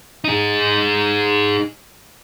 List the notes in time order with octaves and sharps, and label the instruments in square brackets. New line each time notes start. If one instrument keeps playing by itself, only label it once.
[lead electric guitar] D#4 G#4